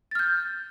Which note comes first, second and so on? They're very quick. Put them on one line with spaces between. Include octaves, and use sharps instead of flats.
A6 F6 G6